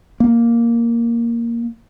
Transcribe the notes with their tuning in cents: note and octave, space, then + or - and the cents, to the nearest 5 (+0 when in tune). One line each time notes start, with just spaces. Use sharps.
A#3 +0